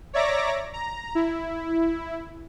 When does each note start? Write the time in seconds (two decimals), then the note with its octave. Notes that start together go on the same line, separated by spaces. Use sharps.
0.13 C#5 D5 E5 A#5 D6 A#6
0.73 A#5
1.15 E4